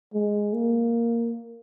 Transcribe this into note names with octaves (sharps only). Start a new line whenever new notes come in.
G#3
A#3